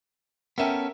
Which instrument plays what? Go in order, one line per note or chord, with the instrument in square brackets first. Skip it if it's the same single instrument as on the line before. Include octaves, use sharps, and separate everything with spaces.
[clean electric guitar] B3 C#4 A4 [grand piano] A#4 E5 G5